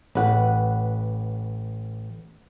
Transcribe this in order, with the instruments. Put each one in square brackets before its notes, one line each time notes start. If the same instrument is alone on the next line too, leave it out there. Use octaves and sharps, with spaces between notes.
[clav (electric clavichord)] A1 [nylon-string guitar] B4 F#5